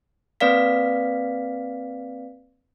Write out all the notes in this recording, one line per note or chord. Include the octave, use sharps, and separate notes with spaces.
A#3 C4 B4 D5 F5 B6